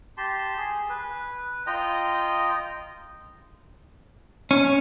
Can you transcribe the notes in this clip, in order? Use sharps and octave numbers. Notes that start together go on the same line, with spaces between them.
G4 A5 C6
G#4
B4
F4 D#5 G5 A#5
C#4